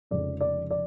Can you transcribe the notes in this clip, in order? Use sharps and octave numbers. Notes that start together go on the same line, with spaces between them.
F1 F2 C#3 G#3 D5
D5
D5